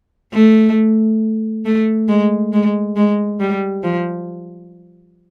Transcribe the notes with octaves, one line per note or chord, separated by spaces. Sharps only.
A3
A3
G#3
G#3
G#3
G3
F3